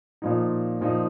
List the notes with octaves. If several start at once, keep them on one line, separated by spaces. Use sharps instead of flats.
A#2 F3 D#4
A#2 F3 D#4